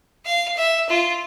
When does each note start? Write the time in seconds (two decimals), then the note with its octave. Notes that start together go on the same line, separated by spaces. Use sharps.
0.25 F5
0.57 E5
0.89 F4